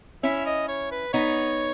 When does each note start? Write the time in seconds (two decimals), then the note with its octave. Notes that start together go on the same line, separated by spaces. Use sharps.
0.23 C#4 E4 E5
0.46 D#5
0.68 C#5
0.92 B4
1.13 B3 D#4 C#5